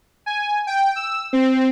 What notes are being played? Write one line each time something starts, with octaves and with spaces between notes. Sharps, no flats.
G#5
G5
E6
C4